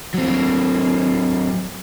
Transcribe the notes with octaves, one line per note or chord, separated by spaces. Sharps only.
F#3 C4